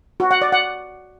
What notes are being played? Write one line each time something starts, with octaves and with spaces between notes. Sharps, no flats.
F#4
F#5
D5
F#5